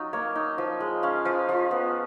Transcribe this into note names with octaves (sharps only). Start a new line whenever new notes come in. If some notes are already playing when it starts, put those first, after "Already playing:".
Already playing: F#3 C#4 D#4 F4 A#4
A#3 C#5
D#4
F3
G#3
C#4 F5
F3
F3
B3